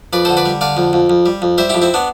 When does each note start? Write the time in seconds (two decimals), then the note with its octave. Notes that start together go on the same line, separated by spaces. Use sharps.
0.13 F2 B4 D5
0.25 D3 A4 C5
0.37 B4 D5
0.45 G3
0.61 D3 D5 F5
0.77 F2
0.93 F2
1.10 F2
1.26 G3
1.42 F2
1.58 G3 C5 E5
1.70 F2 E4 G4
1.82 C4 E4
1.94 B3 D4